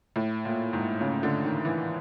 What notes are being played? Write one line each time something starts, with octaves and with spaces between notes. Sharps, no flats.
A2
A#2
G#2
C#3
D3
D#3
E3